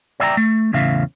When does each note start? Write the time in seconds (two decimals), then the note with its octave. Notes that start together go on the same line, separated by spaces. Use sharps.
0.20 C#5 D5 E5 F5 G5 A#5
0.37 A3
0.73 E2 A2 C#3 E5 F5